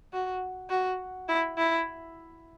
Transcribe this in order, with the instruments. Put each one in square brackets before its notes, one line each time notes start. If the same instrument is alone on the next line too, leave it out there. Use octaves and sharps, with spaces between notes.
[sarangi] F#4
F#4
E4
E4